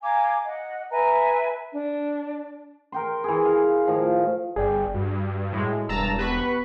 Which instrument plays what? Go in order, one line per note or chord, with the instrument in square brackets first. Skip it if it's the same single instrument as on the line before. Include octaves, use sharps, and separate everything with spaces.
[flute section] F5 G#5 A#5 D6
D#5 F#5
B4 E5 G#5 A#5
D4
[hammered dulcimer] A#4 G5 C6
E3 G#4
F5
A2 D#3 F3
[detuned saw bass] G1 [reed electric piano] G#4 D5 G5
[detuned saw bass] G2 [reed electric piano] F#4
[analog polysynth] A2 G#3
[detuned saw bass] E1 [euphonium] G2 [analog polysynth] A5 A#5 E6
[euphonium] B3 [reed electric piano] G4 [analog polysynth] B4 B5 C#6